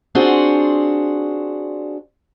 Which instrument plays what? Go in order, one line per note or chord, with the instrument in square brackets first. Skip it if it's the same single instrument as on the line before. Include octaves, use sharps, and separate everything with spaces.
[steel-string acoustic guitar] C4 D4 F4 F#4 G#4